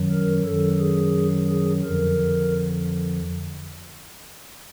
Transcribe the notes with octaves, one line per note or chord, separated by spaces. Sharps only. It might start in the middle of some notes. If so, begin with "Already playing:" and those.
Already playing: F#2 D#3 F#3
A#4
F#2 D#3 F#3 A4
G#4
G#4
F2 D3 F3 A#4